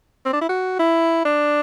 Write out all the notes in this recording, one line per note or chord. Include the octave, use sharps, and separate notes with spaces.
C4
D4
E4
F#4
E4
D4